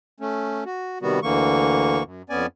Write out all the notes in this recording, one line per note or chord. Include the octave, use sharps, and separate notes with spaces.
A3 C#4
F#4
C3 D#3 G3 B3 F#4
D2 D3 E3 A#3 C#6
F#2
F2 B3 C#4 D5 G#5